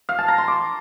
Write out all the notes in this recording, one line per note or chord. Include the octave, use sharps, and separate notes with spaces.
F5
A5
A#5
C6
D6